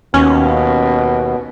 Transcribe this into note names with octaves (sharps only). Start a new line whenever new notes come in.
D#2 B2 C#4